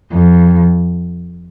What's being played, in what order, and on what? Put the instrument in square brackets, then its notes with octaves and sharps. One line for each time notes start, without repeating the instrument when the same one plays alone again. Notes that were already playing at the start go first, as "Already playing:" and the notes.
[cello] F2